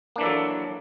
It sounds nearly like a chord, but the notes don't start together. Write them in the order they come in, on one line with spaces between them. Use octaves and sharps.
A#3 D4 E3 A4 F#3